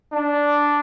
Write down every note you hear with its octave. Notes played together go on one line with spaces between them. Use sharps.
D4